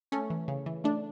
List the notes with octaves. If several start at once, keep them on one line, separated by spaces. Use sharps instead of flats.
A3 C#4
E3
C#3
E3
A3 D4